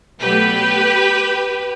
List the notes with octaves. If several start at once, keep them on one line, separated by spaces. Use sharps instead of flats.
B2 F#3 A3 G4 B4